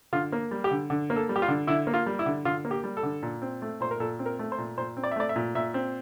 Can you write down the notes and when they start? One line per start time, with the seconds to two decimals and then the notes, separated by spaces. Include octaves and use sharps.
0.13 D3 F4
0.32 A#3
0.51 G3
0.64 G4
0.71 D3
0.90 D3
1.10 A#3
1.16 A4
1.29 G3
1.36 G4
1.42 F4
1.48 D3
1.67 D3 E4
1.87 A#3
1.94 F4
2.06 G3
2.19 E4
2.26 D3
2.45 D3 F4
2.65 A#3
2.71 G4
2.84 G3
2.97 A4
3.03 D3
3.23 A#2
3.42 C4
3.62 A3
3.80 A#2 C5
3.91 A#4
4.00 A#2 A4
4.19 C4
4.26 A#4
4.39 A3
4.52 C5
4.58 A#2
4.78 A#2 C5
4.97 C4
5.03 D5
5.11 E5
5.16 A3 D5
5.29 E5
5.36 A#2
5.55 A#2 E5
5.74 C4